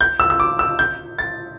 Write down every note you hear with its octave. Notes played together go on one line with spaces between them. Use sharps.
G6
E6
E6
D6
E6
G6
A6